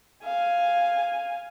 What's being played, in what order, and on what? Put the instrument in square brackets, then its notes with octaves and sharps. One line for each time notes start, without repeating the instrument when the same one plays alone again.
[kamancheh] F5 G#5